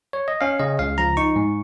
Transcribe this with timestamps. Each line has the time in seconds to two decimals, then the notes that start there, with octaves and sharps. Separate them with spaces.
0.13 C#5
0.28 D#5
0.41 C#4 F5
0.59 C#3 D#5
0.79 C#2 F5
0.98 F3 A#5
1.17 D#4 C#6
1.36 G#2